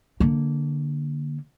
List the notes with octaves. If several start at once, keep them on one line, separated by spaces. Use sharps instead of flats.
D3 A#3